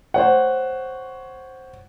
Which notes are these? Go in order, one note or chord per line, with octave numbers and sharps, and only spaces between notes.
C5 C#5 F#5